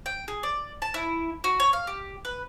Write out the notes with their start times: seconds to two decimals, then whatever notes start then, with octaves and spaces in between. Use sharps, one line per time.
0.06 G5
0.28 G#4
0.43 D5
0.82 A5
0.94 E4
1.44 F#4
1.60 C#5
1.73 F5
1.87 G4
2.25 B4